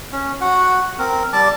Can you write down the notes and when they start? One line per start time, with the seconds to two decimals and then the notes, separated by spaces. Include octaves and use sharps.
0.12 C#4
0.41 F#4 F#5
0.99 C4 A#4
1.33 G3 D5 A5 D6